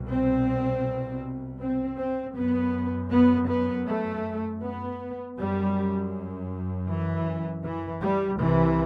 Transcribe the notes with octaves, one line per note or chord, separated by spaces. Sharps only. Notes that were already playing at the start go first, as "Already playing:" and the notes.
Already playing: C2 B2
C4
C4
C4
F#2 B3
B3
B3
A3
B3
F#2 G3
E3
E3
G3
C2 C3 E3